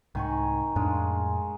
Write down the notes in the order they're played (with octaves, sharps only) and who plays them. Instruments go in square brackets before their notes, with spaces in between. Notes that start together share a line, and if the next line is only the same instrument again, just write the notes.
[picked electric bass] C2 G#2 [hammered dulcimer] D#3 G#5 C#6
[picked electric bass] F2 A2 D4 [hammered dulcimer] G#3 F4 G#4